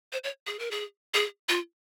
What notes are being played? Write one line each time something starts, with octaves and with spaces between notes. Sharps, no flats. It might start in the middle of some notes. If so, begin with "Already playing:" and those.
C5
C#5
G#4
A#4
G#4
G#4
F4